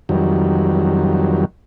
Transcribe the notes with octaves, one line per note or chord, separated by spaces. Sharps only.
F2 D#3 F#3 G3